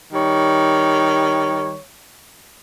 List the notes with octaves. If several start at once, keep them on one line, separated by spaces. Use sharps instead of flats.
D#3 G3 C#5